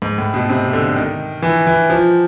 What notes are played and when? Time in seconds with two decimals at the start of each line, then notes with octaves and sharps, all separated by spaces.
0.02 G#2
0.18 A2
0.34 B2
0.49 C3
0.73 D3
0.96 D#3
1.42 E3
1.67 E3
1.90 F3